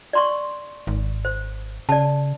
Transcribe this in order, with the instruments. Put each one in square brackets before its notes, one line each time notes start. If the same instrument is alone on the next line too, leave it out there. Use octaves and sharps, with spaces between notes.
[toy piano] D5 C6 C#6
[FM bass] G#1
[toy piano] C5
[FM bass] C#3 [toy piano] D5 A5